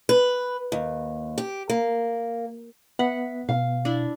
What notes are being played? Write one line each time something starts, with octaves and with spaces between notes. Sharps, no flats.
B4
D#2
G4
A#3
B3 E5 F#5 B6
B2 F5
D4 E4